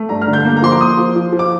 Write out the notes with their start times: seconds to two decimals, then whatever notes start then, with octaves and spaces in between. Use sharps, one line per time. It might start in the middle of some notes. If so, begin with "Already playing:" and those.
Already playing: A3
0.09 G2 A#5
0.22 F6
0.28 D3
0.33 G6
0.45 A#3
0.56 A#5
0.62 F3 C6
0.72 D6
0.80 A#3 D#6
0.98 F3
1.16 F3
1.32 F3
1.39 D6